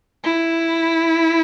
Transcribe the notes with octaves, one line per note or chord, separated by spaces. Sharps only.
E4